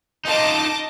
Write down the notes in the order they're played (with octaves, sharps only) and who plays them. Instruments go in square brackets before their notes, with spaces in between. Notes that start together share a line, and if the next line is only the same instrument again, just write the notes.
[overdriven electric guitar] D#4 F4 [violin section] D#5 A5 D6